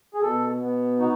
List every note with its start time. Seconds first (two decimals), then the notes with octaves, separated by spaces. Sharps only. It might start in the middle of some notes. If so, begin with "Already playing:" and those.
0.14 G#4
0.22 B2 A4
0.61 B3
0.99 D#4 F#4